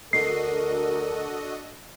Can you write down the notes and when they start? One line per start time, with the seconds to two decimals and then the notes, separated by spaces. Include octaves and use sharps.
0.13 D2 D4 F#4 A4 A#4 D#5 C7